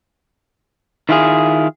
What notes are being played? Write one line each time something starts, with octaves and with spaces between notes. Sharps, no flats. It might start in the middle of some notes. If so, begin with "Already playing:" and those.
D#3 E4 F4 G#4